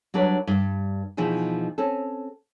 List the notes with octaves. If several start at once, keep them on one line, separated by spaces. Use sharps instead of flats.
F#3 G3 D4 A#4 B4 C#5
G2 G3
B2 E3 F3 D#4 G#4
C4 C#4 A4